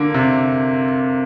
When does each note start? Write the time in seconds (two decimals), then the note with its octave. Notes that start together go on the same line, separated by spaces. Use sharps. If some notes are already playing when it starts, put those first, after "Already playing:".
Already playing: D3 A#3
0.14 C3